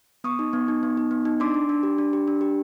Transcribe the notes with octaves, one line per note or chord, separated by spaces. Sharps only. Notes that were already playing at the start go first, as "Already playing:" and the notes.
B3 C#6 D#6
D#4
B3
D#4
B3
D#4
B3
D#4
D4 C6 D6
D4
D4
G4
D4
G4
D4
G4